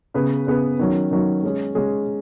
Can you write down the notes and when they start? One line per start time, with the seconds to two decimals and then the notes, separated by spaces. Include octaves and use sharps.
0.14 C#3 B3 G#4 B4
0.47 C#3 B3 G#4 B4
0.79 D#3 F#3 C#4
1.11 D#3 F#3 C#4
1.43 G#3 C#4 G#4
1.75 G#3 C#4 G#4